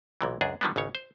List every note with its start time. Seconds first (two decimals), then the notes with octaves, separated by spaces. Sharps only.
0.21 B1 A#2 E3
0.41 C#2 F#2 D4 G#4
0.61 D3 D#3 F3 G3 G#3 B3
0.76 G#1 C#2 C#3 C#5
0.95 C5